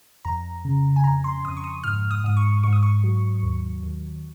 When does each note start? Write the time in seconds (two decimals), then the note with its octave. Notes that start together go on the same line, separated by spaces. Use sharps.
0.25 F2 A#5
0.65 C#3
0.96 G#5
1.04 F2 A#5
1.24 C6
1.44 F2 D#6
1.57 C#6
1.64 D#6
1.84 G#2 F6
2.11 D#6
2.24 G#2 D#6
2.37 C#6
2.63 G#2 C#6
2.73 D#6
2.83 C#6
3.04 F#3
3.43 D#2
3.83 D#2